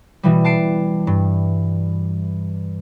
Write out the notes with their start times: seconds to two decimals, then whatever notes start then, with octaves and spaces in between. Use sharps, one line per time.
0.23 B2 E3 G3
0.44 A5 C7 D7
1.07 G2